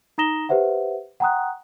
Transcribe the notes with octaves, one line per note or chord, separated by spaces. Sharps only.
D#4 A#5 D#6 A#6 E7 G7
G4 B4 C5 E5 F#5
F#5 G5 A#5 C6 D#6 F#6